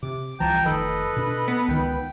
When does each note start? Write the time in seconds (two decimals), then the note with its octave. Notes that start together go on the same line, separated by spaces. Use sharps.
0.03 C3 D6
0.40 C2 E3 F3 G5 A5 A#5
0.65 F1 D#3 A4 B4 D#5
1.17 B2 D4
1.48 B3
1.68 C#2 D#3 G5